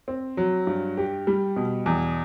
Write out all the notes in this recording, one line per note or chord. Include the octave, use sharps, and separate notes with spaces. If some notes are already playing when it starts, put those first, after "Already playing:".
C4
F#3
G2
G4
G3
B2
E2